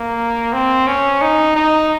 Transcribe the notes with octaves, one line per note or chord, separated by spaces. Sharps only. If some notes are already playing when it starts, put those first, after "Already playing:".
Already playing: A#3
C4
C#4
D#4
D#4